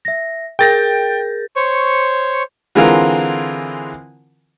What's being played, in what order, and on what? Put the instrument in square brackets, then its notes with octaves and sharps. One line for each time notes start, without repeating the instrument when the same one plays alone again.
[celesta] E5 A#6
[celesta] G#4 A#4 G6 [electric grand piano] G5 A6 A#6
[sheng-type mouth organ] C5 C#5 C#6
[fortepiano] D3 E3 G#3 C4 F4 A#4